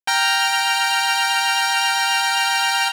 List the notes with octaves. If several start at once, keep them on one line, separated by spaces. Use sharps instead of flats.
G5 A#5 F6